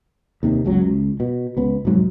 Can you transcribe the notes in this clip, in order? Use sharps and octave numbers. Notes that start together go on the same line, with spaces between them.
D#2 C3 D#3
F#1 C#2 F#3
C#2
B2
C#2 B3
F1 F2 G#2 F#3